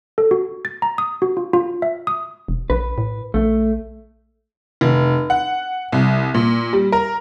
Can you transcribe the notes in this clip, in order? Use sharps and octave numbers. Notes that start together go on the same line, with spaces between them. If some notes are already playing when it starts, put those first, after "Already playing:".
A4
F#4
A6
A#5
D#6
F#4
F4
F4
E5
D#6
E1
A#1 B4
A2
A#1 A3
F1
F#5
C2
A#2
G3
A#4